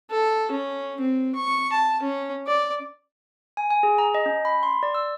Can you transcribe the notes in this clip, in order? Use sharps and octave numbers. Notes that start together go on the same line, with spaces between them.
A4
C#4
C4
C#6
A5
C#4
D5
G#5
G#5
G#4
A#5
D#5
C#4
B5
C6
D5
E6